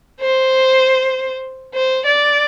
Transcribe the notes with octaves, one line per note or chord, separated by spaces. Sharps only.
C5
C5
D5